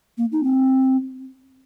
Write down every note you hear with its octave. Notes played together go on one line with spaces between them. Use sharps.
A#3
D#4
C4